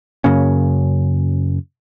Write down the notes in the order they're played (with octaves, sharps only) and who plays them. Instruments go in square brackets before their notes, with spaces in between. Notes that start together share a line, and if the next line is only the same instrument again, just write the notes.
[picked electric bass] F#2 C#3 A#3 C#4